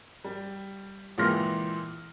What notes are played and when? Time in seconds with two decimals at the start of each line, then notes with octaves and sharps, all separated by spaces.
0.24 G3
1.18 C#2 A#2 E3 C6 F6 A#6